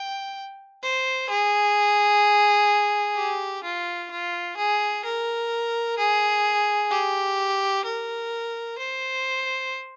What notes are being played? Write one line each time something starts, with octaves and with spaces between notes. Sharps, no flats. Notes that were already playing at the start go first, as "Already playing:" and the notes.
Already playing: G5
C5
G#4
G4
F4
F4
G#4
A#4
G#4
G4
A#4
C5